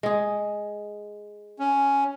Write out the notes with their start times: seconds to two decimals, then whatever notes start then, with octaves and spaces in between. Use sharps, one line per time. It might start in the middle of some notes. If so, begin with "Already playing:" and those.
0.03 G#3 G#4
1.59 C#4